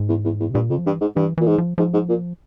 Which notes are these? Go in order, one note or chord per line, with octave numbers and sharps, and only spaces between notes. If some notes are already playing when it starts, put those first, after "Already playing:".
Already playing: G#2
E2
E2
E2
C3
G2 A#2
F2 C#3
F3
G2 E3
G#2
G2 E3
A#2 E3
G#2
F3
G#2 F3
G#2
A#2